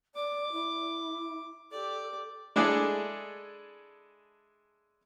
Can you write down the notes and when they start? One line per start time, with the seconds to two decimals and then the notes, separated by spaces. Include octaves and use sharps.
0.15 D5 D6
0.52 E4
1.72 G4 A4 D5
2.56 G#3 D4 E4 G#4 A4